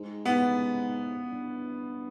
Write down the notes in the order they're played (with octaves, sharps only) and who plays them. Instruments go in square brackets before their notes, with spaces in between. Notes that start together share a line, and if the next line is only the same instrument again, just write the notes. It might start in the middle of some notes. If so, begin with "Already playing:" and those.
Already playing: [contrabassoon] G#2
[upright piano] B3
[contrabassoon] G2